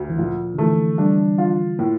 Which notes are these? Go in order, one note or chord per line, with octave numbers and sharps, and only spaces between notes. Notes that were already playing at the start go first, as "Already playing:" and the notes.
Already playing: D2
E3
A#2 F3
D3
E3 A3
G3 D4
F4
A2 A#3